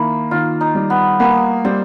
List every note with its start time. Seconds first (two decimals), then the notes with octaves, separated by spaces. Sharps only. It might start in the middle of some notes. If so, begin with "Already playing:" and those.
Already playing: D#3 A#3 E4
0.31 D#3 F4
0.61 D#4
0.75 G3
0.90 B3
1.20 A#3 B3
1.65 G3 C4